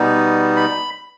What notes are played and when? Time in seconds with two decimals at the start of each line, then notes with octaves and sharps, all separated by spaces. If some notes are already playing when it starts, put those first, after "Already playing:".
Already playing: B2 G3 B3 D#4
0.56 B5